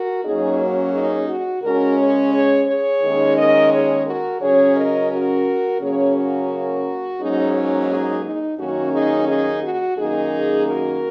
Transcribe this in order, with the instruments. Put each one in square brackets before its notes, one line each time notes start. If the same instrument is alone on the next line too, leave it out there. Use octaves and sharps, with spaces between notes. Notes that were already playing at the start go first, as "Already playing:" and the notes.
Already playing: [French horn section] F#4 A#4
F#2 F#3 A#3 C#4 D#4 G#4
F#4
D#4 G#4
F#4
C#3 G#3 C#4 F#4 A#4
G#4 C#5
G#4 C#5
G#4 C#5
D#2 D#3 G#3 C#4
A#4 D#5
G#4 C#5
F#4 A#4
C#3 F#3 C#4 G#4 C#5
A#4 D#5
F#4 A#4
C#3 F#3 A#3 C#4 G#4 C#5
F#4 A#4
G#2 F#3 A#3 C#4 D#4 G#4
D#4
D#4 G#4
D#4
F#2 D#3 A#3 C#4 F#4
D#4 G#4
D#4 G#4
F#4
F#2 D#3 A#3 D#4 G#4
F#4 A#4